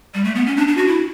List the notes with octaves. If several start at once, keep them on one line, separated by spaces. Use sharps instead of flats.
G3
A3
B3
C#4
D4
D4
F#4
E4